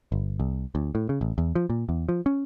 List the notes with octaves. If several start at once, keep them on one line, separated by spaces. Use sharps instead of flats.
G1
C2
D2
A2
C#3
A1
E2
F3
A#2
E2
F3
C#4